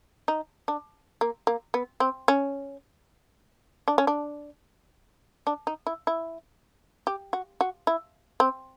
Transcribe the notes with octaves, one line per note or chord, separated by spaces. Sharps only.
D#4
D4
A#3
A#3
B3
C4
C#4
D4
C#4
D4
D4
D#4
E4
E4
G4
F#4
F#4
E4
C4